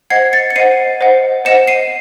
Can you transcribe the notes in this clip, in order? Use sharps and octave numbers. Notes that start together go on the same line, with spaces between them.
C5 D#5 F#5 G#6 C7
A6 C#7
C#7
C5 D#5 F#5 C7 D#7
C5 D#5 F#5
C5 D#5 F#5 C#7 E7
C7 D#7